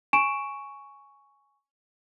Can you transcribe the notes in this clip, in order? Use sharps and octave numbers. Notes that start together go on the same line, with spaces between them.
G#5 C#6 D7 E7